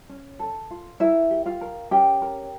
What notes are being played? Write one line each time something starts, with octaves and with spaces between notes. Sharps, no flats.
C#4
A4
F4
E4 A#4 E5
G4
F4 F5
A#4
C#4 G4 G5
A#4